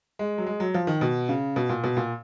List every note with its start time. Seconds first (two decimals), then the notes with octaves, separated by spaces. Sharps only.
0.19 G#3
0.38 F#3
0.47 G#3
0.60 F#3
0.74 F3
0.87 D#3
1.01 B2
1.29 C#3
1.56 B2
1.69 A#2
1.84 B2
1.97 A#2